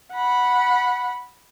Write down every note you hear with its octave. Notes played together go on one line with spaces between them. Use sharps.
F#5 B5